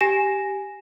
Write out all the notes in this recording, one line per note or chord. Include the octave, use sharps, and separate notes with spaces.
G4 G#5 A#6 E7